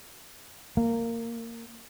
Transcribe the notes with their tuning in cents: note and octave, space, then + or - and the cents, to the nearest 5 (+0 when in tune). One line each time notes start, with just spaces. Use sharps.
A#3 -15